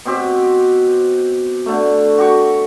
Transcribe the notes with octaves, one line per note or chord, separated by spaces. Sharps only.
B2 C4 G4
D3 A3
F#4 G4 C#6